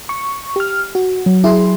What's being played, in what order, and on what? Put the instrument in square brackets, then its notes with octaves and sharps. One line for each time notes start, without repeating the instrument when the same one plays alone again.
[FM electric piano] C#6
G4 F6
F#4
[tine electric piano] F#3
[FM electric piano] E4 G#4 C6